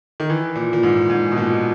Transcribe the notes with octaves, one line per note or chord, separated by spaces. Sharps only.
D#3
E3
A#2
A#2
G#2
G#2
B2
A#2